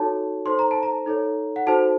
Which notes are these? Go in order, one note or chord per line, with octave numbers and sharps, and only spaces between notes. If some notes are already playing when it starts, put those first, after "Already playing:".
Already playing: D#4 F#4 A4 C#5 A5
D#4 A4 C5 C6
A#5
A5
A#5
D#4 A4 C#5
F#5
D#4 F#4 A4 C5 A5